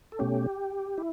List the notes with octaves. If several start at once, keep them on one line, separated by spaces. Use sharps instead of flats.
A4
B2 A3 C#4 G4
E4